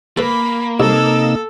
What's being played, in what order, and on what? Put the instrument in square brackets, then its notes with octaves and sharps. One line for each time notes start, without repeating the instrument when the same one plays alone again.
[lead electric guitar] A#3 [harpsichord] A4 B4 [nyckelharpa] B5
[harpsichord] C2 [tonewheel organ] C3 D#4 E6 [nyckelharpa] A4